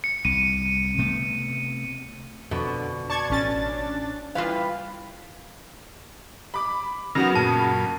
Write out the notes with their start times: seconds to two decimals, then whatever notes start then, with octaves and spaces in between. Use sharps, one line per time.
0.04 C#7
0.25 C2 D#7
0.98 C3 A3 B3
2.51 F2 B2 D3
3.09 D4 A5 C#6 G#6
3.30 A1 C#4 A6
4.35 E3 G3 F4 B4 F5
6.54 B5 D6
7.15 C#3 F#3 B3 D#4 A#4 A#5
7.35 F#2 A#2 A5